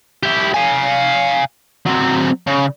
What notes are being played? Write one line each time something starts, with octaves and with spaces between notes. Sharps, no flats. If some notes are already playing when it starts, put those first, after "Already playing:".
E4 G4
F5 G#5
F#3 C4
C#3